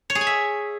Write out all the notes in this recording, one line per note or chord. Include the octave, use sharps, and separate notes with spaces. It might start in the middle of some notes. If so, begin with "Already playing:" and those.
C#5
G#4
G#5
E5